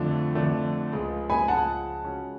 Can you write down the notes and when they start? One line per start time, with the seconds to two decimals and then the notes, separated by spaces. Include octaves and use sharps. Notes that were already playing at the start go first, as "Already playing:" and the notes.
Already playing: F2 D3 F3 A3 D4
0.35 F2 D3 F3 A3 D4
0.92 C#2 C#3 F3 G#3
1.30 G#5 B5
1.48 C#2 C#3 F3 G#3 F#5 A5
2.05 C#3 G#3 C#4 F#4